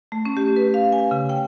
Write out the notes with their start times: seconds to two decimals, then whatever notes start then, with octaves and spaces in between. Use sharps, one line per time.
0.12 A3
0.25 C#4
0.37 G4
0.56 B4
0.74 F5
0.92 G#5
1.11 C#3
1.29 G5